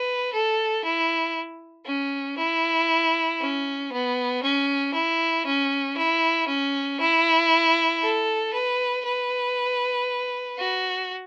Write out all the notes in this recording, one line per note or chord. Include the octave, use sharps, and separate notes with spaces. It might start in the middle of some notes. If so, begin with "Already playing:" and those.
Already playing: B4
A4
E4
C#4
E4
C#4
B3
C#4
E4
C#4
E4
C#4
E4
A4
B4
B4
F#4